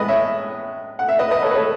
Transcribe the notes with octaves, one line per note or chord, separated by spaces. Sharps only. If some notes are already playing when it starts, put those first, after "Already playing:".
Already playing: A2 G#3 B3 B4 D#5
C#5 E5
F#5
E5
B4 D#5
B4 D#5
A4 C#5
B4
A4 C#5